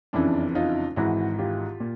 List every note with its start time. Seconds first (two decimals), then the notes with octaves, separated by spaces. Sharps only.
0.13 F#1 F2 C#3 E3 D4 E4
0.55 D#4 F4
0.96 G#1 G#2 E3 E4 F#4
1.39 F4 G4
1.80 A#2